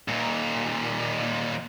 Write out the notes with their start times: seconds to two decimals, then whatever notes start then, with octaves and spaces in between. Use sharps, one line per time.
0.08 D#2 A#2